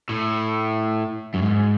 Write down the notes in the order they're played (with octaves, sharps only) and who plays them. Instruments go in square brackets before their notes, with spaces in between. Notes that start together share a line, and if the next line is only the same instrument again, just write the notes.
[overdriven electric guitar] A2
F#2
G#2